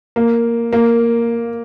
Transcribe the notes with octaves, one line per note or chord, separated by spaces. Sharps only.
A#3
A#3